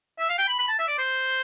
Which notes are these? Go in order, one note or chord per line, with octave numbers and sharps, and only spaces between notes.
E5
F5
G5
B5
B5
A5
E5
D5
C5